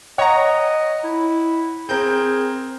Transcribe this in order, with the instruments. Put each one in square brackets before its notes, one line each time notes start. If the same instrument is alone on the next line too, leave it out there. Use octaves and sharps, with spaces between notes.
[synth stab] C#5 A#5 [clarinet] D#5 [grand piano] F#5
[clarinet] E4
[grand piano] C4 A#4 [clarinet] G#4 [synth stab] G6